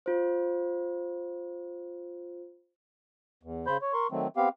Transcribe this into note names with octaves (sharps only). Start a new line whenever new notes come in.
F4 C5
E2
C#3 C5 B5 G6
C#5
A#4 C6 C#6
D#3 F#3 A3 C4
B3 C4 G4 F5